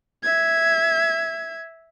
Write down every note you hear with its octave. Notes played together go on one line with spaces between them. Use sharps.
E5 G#6